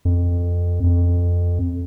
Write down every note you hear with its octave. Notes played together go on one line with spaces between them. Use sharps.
F2
F2